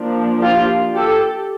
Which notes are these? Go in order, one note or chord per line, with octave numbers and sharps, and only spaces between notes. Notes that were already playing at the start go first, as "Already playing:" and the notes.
Already playing: F3 A#3 D4
F4 G4
G4 A4